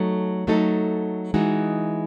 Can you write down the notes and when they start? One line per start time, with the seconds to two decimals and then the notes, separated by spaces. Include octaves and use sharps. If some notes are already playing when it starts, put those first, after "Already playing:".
Already playing: F#3 A3 D#4 A4
0.47 F#3 A3 D#4 A4
1.34 E3 G#3 D#4 F#4